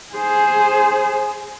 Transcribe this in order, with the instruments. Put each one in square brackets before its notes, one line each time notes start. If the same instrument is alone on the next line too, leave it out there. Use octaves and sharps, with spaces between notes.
[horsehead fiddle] G#4 C5